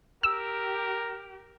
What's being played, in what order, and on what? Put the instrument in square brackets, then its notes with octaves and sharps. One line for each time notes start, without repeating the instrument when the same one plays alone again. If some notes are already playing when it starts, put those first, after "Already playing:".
[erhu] G4 [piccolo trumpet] A#4 [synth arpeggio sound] E6